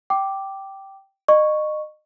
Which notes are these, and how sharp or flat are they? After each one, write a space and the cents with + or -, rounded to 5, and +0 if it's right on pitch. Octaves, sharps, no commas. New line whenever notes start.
G5 -10 D6 +0
D#5 -30 C#6 +0